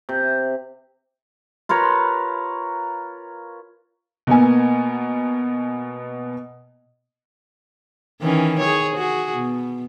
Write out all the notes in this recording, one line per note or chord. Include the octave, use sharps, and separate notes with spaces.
C3
F4 A#4 B4 C#5
B2 A#3 B3 G#5
D#3 E3 C#4
G#4 C#5
F#4 G#4
B2